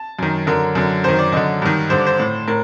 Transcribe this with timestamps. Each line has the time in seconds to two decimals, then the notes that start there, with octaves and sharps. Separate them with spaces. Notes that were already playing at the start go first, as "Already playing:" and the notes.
Already playing: A5
0.19 F#2 D#3
0.47 F#2 D3 A#4
0.75 F#2 D3
1.04 F#2 D#3 C5
1.19 D5
1.32 F#2 D3 D#5
1.62 G2 D#3
1.90 G2 D3 C5
1.98 D5
2.07 C5
2.19 A2
2.48 A2 A#4